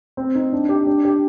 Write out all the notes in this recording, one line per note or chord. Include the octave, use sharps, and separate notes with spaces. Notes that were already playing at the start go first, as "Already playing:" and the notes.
C4
D#4
D4
G4
D4
G4